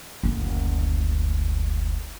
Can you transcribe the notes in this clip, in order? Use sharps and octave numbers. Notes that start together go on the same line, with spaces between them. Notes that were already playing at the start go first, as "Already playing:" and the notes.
F#1 D2